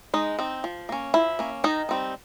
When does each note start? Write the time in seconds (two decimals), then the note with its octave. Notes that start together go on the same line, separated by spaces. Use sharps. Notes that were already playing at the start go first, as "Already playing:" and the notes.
0.14 G#3 D#4
0.39 C4 D#4
0.64 F3
0.89 A#3 C#4
1.14 F3 E4
1.39 A#3 C#4
1.64 D#3 D#4
1.89 G3 C4 D#4